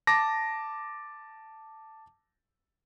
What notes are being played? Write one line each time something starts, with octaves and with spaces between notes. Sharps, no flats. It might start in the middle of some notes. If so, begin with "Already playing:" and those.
A5 D6 A#6